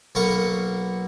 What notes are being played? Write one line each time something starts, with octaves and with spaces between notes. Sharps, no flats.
B1 A#3 B3 F5 C#6